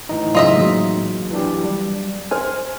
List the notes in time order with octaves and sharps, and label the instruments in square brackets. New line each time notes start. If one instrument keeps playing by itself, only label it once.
[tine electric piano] A2 E3 D#4
[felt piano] F#2 C#3 [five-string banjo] F4 D#5 E5
[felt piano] F#3 G#3 A#3
[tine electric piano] E3 D4 G4
G3
[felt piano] C5 F6 [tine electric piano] G#5